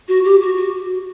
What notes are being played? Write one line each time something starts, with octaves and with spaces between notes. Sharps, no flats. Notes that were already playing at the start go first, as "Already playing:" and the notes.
F#4
G4
F#4
F#4